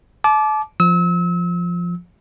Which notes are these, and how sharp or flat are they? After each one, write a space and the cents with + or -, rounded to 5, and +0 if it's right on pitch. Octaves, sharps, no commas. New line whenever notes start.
A5 -35 D6 +0
F3 +0 E6 -35